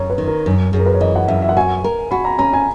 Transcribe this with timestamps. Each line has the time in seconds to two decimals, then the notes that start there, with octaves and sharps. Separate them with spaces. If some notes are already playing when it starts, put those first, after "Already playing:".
Already playing: F#2 C#5 A#5
0.10 B4
0.18 D#3
0.28 A#4
0.46 F#2
0.72 F#2 G#4
0.79 A#4
0.86 B4
0.94 C#5
1.01 E3 D#5
1.15 F#5
1.28 F#2 E5
1.42 E5
1.49 F#5
1.57 F#4 G#5
1.84 A#4
2.11 F#4 B5
2.25 A#5
2.38 C#4 A#5
2.53 G#5